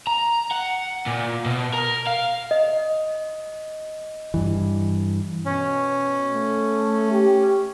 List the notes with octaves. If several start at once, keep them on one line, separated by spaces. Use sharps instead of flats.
A#5
F#5
A#2
B2
A#4
F5
D#5
G2 E3
B2 C#4
A3
G4